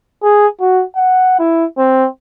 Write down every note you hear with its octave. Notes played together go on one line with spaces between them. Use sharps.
G#4
F#4
F#5
E4
C4